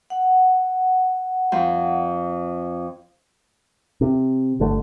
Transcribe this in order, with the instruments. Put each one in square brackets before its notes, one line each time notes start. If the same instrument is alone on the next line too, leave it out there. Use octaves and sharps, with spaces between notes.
[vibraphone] F#5
[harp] F2
[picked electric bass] C3
G1 D3 A3